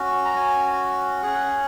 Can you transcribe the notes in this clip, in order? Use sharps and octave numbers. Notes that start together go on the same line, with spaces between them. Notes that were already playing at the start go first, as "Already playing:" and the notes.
Already playing: C#4 F#4
A#5
G#5
C#4 G#4 F#5